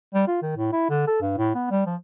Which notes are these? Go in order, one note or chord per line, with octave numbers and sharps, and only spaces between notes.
G3
F4
D#3
A2
E4
D3
A4
G2
A2
B3
G3
F3